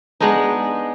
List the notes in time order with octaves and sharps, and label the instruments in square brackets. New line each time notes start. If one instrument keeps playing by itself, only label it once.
[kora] G#3 B3 D4 D#4